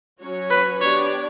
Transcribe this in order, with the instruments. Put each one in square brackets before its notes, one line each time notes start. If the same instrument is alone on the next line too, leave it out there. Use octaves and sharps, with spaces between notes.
[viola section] F#3 C#4 F#4 C#5
[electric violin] B4
[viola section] B3 D4 G4 D5 [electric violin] C#5